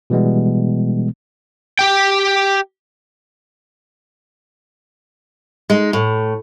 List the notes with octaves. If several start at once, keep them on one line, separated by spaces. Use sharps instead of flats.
B2 E3 G3 G#3 B3
G4 G5
G#3 D#4
A2